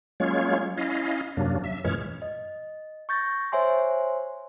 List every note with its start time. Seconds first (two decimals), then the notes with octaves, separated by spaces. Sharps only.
0.20 F#3 G#3 A#3 C#4 F4 C#5
0.78 C#4 E4 D#5 F5
1.37 F#2 C3 F#3 A#3 D4
1.64 E5
1.84 F#2 A#2 E3 G#3 C#5 F6
2.22 D#5
3.09 C#6 G6 A6 A#6
3.52 C5 C#5 E5 G#5 C6